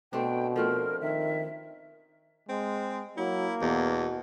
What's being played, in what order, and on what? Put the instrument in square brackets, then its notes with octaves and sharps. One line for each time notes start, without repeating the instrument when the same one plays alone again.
[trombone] B2 [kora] A3 C4 D4 [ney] G5
[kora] F3 A3 C4 [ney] A#4
[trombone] D#3 [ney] E5
[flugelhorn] G#3 [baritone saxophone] C4
[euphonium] F#3 [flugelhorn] A#3 [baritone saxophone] E4
[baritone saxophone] E2 [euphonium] B2